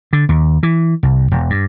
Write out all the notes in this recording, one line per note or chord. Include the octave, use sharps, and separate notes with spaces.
D3
D#2
E3
C2
E1
G2